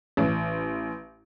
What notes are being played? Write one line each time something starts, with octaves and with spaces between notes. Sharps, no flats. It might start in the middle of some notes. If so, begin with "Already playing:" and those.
A1